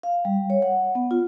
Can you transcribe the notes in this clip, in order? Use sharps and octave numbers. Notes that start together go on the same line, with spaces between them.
F5
G3
C#5
F#5
B3
F4